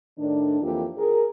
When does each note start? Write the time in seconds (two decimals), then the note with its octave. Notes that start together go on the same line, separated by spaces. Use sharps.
0.18 A2 D#3 D4
0.62 F2 E3 A#3 F4 G4
0.98 G#4 A#4